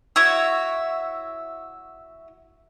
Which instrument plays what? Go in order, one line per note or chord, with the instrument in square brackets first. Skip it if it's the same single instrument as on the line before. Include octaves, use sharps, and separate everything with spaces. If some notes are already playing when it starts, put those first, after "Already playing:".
[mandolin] E4 F#4 C#5 E5